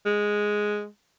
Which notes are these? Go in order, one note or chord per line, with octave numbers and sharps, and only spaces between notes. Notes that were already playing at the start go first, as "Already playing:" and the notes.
G#3